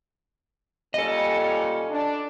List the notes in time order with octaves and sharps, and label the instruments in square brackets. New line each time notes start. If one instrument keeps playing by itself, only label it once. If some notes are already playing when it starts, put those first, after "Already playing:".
[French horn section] A#2 G3 C#4 [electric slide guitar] A4 D#5
[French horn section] D4